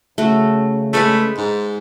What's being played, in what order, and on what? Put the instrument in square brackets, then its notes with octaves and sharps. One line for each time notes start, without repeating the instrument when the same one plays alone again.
[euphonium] C#3 [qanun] A3 F#4
[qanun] G#3 B4 G#5 [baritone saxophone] A3
[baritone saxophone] G#2